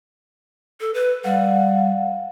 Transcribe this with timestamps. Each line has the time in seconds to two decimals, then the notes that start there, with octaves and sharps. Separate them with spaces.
0.80 A4
0.94 B4
1.24 G3 F5 F#5